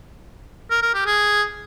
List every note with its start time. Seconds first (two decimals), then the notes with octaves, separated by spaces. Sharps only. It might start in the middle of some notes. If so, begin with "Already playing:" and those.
0.70 A#4
0.82 A#4
0.94 G4
1.06 G#4